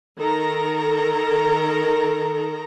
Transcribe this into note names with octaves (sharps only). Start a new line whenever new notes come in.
D#3 A4 A#4 A#5